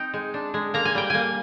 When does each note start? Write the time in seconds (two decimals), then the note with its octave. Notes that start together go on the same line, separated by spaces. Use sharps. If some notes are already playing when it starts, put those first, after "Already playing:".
Already playing: C4 D#4 G5
0.14 G#3
0.34 D4
0.54 G#3
0.74 A#3 A#5
0.85 G#5
0.95 G3 G5
1.10 A#3 G#5